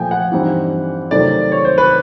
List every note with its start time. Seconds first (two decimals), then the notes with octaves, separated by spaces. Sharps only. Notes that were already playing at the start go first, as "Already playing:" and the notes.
Already playing: A#2 F3 A3 G5 G#5
0.11 F#5
0.32 G2 E3 G3 C4 D#4
1.11 C3 D#3 F#3 A3 C4 D5
1.52 C#5
1.65 C5
1.78 B4